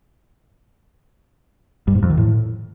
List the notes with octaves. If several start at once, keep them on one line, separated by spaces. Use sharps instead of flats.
G2
G#2
F2
D#3
A2